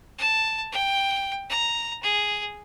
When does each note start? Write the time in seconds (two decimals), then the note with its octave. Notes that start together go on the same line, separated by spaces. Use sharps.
0.18 A5
0.72 G5
1.49 A#5
2.03 G#4